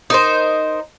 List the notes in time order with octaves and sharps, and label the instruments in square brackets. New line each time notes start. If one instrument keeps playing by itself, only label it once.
[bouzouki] D#4 A#4 C5